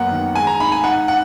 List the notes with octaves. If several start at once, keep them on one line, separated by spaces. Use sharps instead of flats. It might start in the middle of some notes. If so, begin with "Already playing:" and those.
Already playing: F#2 A#3 B3 F#5
D#3
G#3 G#5
A#5
D#4 B5
G#5
D#4 F#5
F#5